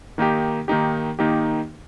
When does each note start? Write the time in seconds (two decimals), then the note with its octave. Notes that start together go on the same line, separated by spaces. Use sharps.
0.18 D#3 A#3 D#4 G4
0.68 D#3 A#3 D#4 G4
1.19 D#3 A#3 D#4 G4